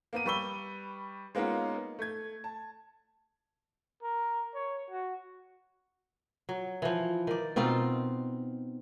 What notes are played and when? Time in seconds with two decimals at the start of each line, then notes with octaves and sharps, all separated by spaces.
0.13 A#3 B3 D#7
0.26 G3 B4 C#6 E6 G7
1.35 G#3 A#3 B3 C#4 D#4 F4
1.99 A3 G#6
2.44 A5
4.02 A#4
4.54 C#5
4.90 F#4
6.49 F#3
6.82 E3 F3
7.27 D#3 D5
7.56 B2 C4 D#4 F4